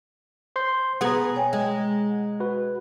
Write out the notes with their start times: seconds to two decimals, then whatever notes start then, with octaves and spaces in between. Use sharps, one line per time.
0.56 C5 C6 G6
1.01 B2 B3 G#4 F#5 A#5
1.36 C#5 G5 G#5
1.53 G#3
2.40 F#4 B4